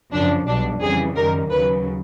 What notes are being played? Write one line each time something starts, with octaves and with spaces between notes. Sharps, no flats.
F#2 C#3 F3 D4
B1 B2 G3 D4
F2 C#3 E3 G3 G#4
F#2 D#3 G3 A#4
D#2 C#3 F#3 B4